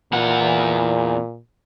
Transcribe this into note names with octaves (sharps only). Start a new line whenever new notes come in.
E2 A#2 F#5